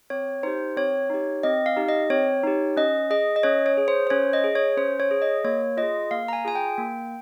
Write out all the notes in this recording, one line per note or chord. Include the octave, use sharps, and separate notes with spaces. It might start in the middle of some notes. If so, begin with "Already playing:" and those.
C4 C#5
D#4 G4 C5
C4 C#5
D#4 G4
C4 D#5
F5
D#4 G4
D#5
C4 C#5
D#4 G4
C#4 D#5
G#4 D#5
D#5
C#4 C#5
C#5
G#4
C5
C5
C#4 C#5
D#5
G#4
C#5
C#4 C5
C#5
G#4
D#5
A#3 C#5
F4 G#4 D#5
A#3 F5
A#5
G#5
F4 G#4 G#5
G5
A#3